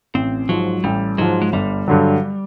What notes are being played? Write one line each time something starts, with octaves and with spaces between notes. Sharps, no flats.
A1 C4
G#2 F3 F#3
A1 G3
G#2 F3 F#3
G#3
G1 G3
G2 D3 F#3